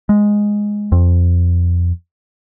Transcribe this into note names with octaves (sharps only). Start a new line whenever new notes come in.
G#3
F2